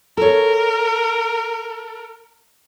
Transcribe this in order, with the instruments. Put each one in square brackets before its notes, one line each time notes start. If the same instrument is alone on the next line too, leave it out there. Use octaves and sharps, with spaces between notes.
[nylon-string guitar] A4 C#5 [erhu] A#4